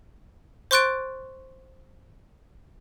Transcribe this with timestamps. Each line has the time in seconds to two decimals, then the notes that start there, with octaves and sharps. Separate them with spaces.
0.71 C5 C6 C#6 F#6 A6 D7